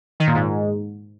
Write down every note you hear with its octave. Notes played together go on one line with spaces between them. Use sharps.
D#3
A#2
G#2